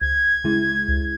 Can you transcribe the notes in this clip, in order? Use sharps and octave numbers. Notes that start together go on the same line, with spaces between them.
C#2 G#6
C#3 G#3 E4
C#2